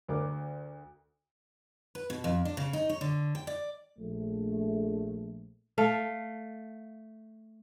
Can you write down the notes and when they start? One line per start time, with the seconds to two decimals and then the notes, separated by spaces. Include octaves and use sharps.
0.08 D2 A#4 D6
1.95 B4
2.10 B2
2.24 F2
2.45 D4
2.57 C#3
2.73 D#4
2.89 C#5
3.01 D3
3.35 G5
3.47 D5
3.98 A#1 A3
5.78 A3 F5